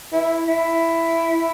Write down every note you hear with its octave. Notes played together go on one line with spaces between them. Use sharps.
E4
E4